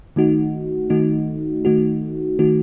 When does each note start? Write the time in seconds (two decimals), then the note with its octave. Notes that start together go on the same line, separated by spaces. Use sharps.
0.16 D#3 A3 D#4 F#4
0.90 D#3 A3 D#4 F#4
1.65 D#3 A3 D#4 F#4
2.39 D#3 A3 D#4 F#4